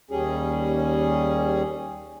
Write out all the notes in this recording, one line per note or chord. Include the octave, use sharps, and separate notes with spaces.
D#2 G3 C#4 G#4